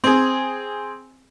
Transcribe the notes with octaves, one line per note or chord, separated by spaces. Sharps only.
C4 G#4